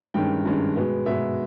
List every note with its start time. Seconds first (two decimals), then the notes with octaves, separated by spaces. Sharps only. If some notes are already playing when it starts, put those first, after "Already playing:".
0.14 G2 D#3 G#3 C#4 G5
0.45 G2 D#3 G#3 C#4
0.75 B2 G#3 B3
1.05 B2 G#3 B3 E5